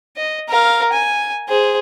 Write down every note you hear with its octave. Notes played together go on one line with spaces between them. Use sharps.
D#5
A#4 F5
G#5
G#4 C5